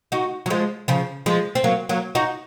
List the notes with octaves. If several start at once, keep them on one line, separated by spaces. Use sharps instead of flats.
D#4 F#4
F#3
F3 G#3
C#3 F3
F3 G#3
C4
F#3 A#3
F#3 A#3
D#4 F#4